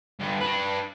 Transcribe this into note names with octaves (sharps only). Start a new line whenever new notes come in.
G2 D3
D4 B4